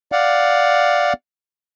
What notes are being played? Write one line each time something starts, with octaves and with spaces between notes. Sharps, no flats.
D5 F5 F#5